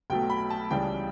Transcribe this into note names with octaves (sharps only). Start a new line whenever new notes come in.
B1 B2 F#3 A3 G5
B5
A5
C#2 C#3 E3 G3 G5